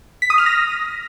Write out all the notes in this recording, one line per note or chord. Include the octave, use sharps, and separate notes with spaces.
B6
D#6
F6
A#6